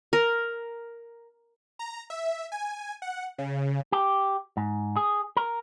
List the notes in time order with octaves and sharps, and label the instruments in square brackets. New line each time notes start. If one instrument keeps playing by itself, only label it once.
[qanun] A#4
[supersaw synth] A#5
E5
G#5
F#5
C#3
[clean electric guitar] G4
G#2
G#4
A#4